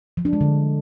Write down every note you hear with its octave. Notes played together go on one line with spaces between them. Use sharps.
F3
D4
G#3
D3